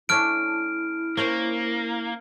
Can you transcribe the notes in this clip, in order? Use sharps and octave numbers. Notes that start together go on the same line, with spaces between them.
A3 C#4 D4 E4 F6 D7
A#3 C#4 A#4 C5